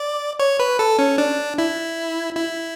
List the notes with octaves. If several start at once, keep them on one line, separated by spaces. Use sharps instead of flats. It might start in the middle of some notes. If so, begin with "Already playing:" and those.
Already playing: D5
C#5
B4
A4
C#4
D4
E4
E4